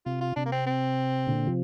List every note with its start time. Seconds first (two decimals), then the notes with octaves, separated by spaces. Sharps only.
0.06 C3 F4
0.21 F4
0.36 C3 D4
0.46 A#3
0.52 C4
0.66 C4
1.27 A#2 D3
1.47 C3 F3